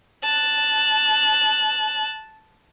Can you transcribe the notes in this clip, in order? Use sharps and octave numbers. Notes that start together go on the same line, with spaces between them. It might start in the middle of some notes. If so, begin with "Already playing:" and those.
A5 F#6